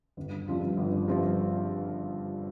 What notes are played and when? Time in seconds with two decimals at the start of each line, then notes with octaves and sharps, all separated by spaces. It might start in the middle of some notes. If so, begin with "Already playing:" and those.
0.17 G1
0.48 G2 F3 C4 F4
0.77 G1
1.08 G2 F3 C4 F4